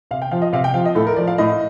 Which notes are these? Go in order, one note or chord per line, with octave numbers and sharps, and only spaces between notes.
C3 F5
G5
F3 F5
D#5
C3 F5
G5
F3 F5
D#5
A2 A4
A#4
F3 D5
F5
A2 D#5